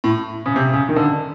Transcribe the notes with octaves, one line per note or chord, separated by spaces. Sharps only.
A2
C#3
C3
C#3
D#3
D3